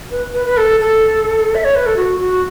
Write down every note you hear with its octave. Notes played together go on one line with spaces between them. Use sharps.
B4
B4
B4
A4
A4
E5
C#5
B4
A4
F#4
F#4